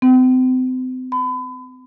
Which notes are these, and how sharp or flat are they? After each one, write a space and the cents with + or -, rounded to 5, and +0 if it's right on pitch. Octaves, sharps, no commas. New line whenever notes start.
C4 -40
B5 +35